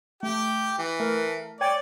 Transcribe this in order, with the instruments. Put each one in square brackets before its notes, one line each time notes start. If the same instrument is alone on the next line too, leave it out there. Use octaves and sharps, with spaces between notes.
[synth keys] A3 [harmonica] G4 G5
[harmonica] E3
[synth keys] A3 A#4
[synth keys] C#5 G5 G#5 [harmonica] D5